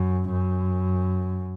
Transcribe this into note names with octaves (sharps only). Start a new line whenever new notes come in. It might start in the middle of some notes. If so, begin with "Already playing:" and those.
Already playing: F#2
F#2